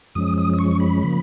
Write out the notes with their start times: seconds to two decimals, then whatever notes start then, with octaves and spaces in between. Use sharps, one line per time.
0.15 F#2 F3 G#3 C#4 D#6
0.38 D#6
0.53 D#6
0.59 C#6
0.80 B5
1.03 C#3 F3 A#3